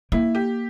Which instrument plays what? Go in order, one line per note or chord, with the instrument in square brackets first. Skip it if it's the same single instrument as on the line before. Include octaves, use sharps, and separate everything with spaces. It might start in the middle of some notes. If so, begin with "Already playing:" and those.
[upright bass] A#3 [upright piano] E4
[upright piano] G4